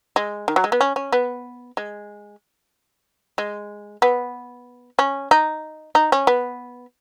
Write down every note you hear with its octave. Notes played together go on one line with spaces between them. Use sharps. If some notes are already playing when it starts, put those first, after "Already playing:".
G#3
D#3
F#3
G#3
B3
C#4
C#4
B3
G#3
G#3
B3
C#4
D#4
D#4
C#4
B3